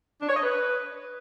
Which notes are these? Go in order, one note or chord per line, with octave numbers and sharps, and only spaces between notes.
D4
C#5
D#5
B4